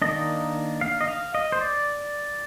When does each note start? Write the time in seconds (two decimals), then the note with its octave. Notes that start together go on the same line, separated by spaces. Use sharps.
0.02 D#3 A#3 D4 D#5
0.81 F5
1.01 D#5
1.08 F5
1.34 D#5
1.52 C5
1.61 D5